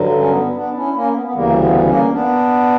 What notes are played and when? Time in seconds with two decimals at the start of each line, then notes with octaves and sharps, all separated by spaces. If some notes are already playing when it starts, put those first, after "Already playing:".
Already playing: G2 D3 F#3
0.18 C#4
0.30 B3
0.56 B3 D4
0.75 C#4 E4
0.95 A#3 C#4
1.14 B3
1.26 B3
1.35 D2 C#3 E3 G3 A#3
1.62 B3
1.87 A#3 C#4
2.13 B3 D4